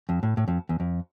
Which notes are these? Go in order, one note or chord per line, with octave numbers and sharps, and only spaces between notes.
F2
A2
A2
F2
E2
F2